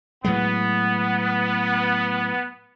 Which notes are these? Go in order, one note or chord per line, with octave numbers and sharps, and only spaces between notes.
A2 F#3 G#3 B3